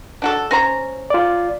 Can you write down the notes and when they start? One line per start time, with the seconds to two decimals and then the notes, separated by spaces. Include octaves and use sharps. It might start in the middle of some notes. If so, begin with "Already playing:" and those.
0.22 D4 F#4 A4
0.51 C#4 C5 A#5
1.10 F4 D5